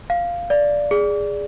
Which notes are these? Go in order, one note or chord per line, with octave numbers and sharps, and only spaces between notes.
F5
D5
G#4